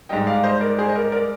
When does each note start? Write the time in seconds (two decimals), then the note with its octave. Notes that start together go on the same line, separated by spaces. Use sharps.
0.09 G#2 G3 D#5 G5
0.27 D5 F5
0.44 C5 D#5
0.61 A#4 D5
0.79 G#4 C5
0.89 D#5
0.95 A#4 D5
1.12 A#4 D5